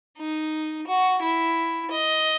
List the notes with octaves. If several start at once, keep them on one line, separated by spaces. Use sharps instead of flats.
D#4
F#4
E4
D#5